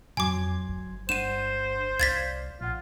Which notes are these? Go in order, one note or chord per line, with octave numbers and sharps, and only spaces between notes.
F2 F#3 G#5 C6 D6 G#6
G1
G2 D4 C5 F#5 D#7 E7
C2 D5 F5 G#6 A6 B6
A#1 F4 F#5